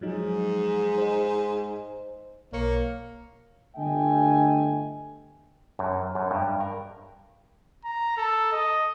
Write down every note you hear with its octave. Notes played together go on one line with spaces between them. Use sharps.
G#2 F3 F#3 D#4
C5 D#5
B1 A#3 C#5 C#7
G1 D3 A3 D#5 G5 G#5
F#2
F#2
G2
A#4
A#5
A4
D#5